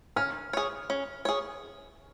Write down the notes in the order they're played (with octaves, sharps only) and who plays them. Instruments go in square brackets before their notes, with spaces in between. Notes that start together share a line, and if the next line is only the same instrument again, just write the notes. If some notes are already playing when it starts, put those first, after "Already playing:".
[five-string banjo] C#4 [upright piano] F6
[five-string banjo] G#4 C#5
C#4
G#4 C#5